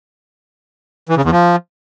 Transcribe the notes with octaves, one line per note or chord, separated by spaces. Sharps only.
E3
C#3
E2
F3